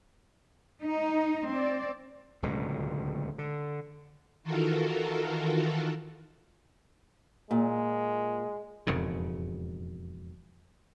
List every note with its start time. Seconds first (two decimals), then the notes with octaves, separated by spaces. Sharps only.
0.82 D#4
1.51 C4 D5
2.42 D1 C#2 B2 D3
3.38 D3
4.43 D#3 E3 F4 F#4 A4 A#4
7.51 A#2 G#3
8.87 E1 F2 G#2 C#3